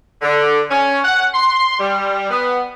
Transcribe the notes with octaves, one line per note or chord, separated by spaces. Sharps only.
D3
C#4
F#5
C6
G3
B3